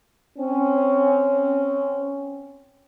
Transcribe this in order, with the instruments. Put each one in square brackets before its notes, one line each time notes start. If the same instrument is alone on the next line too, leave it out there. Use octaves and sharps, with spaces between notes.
[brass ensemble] C4 C#4